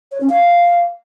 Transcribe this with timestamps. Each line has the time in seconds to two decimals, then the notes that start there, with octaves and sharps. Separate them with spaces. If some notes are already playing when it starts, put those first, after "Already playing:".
0.12 C#5
0.21 C#4
0.30 F5